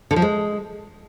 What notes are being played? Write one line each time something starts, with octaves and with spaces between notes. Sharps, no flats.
D3
F3
G#3